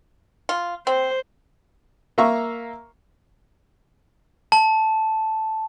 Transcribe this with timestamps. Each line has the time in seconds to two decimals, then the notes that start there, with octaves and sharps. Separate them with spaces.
0.49 F4
0.87 C4 C5
2.18 A#3 E5 F5 A#5 C#6
4.52 A5